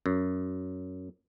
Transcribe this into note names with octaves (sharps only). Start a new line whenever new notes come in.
F#2